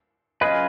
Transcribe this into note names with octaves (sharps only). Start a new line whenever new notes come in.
F#3 C#4 F4 G#4 B4 D#5